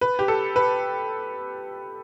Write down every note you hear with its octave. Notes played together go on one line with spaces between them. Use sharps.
B4
G4
A4
B4